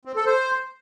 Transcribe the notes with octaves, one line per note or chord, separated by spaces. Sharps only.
C4
A4
C5